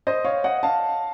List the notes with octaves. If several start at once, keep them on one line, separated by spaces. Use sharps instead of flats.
C5 D#5
C#5 F5
D#5 F#5
F5 A5